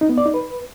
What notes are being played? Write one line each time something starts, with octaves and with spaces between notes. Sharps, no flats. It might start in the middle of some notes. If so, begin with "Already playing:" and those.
D#4
B3
D5
D#4
B4